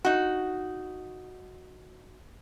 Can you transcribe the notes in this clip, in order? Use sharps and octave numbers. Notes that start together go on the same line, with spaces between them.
D#4 F#4